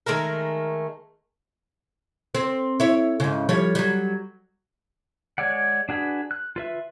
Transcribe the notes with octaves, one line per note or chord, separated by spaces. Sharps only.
D#3 G#3 A3 A#4
C4
E4 C#5
G#2 C#3
F3 G3 C#5
F#3 G3
G#3 C#5 D5 F#5
D4 F#4 G#4 B4
F#6
F4 B4 E5